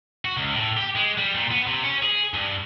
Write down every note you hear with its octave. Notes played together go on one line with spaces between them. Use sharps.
F#4
C#2
A2
G4
G#3
G3
A#2
B3
C3
C#4
G#4
G2